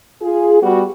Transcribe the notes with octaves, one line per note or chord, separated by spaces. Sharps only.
F4 G#4
G3 B3 F#4